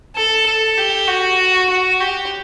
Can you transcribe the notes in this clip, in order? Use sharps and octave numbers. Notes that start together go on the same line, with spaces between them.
A4
A4
G4
F#4
F#4
G4